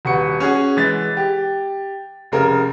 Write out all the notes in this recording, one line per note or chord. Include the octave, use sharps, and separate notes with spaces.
D#1 F#4 B4 C#6 C#7
C#4 F#4 G#4
E3 G#3 A6
G4
F1 C#3 A#4